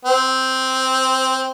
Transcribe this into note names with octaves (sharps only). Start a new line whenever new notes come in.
C4